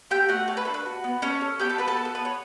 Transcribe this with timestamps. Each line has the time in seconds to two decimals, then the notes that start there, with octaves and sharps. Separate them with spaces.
0.11 A3 G4 G5
0.29 A3 F#4 F#5
0.48 A4 C#5
0.57 B4
0.65 D4 A4
0.74 B4
0.86 F#4
1.04 B3
1.22 C#4 A4 C#5
1.41 A4
1.59 B3 G4 G5
1.69 A4 A5
1.78 F#4 B4 B5
1.88 A4 A5
1.97 B3
2.05 A4
2.15 B3 B4
2.25 C#5